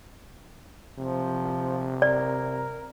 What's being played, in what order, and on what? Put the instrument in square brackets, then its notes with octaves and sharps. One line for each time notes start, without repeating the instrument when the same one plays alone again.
[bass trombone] C3 [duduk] F3
[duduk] A#4 [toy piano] D5